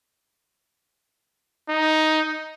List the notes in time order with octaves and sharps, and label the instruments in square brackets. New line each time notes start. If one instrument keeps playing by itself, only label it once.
[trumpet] D#4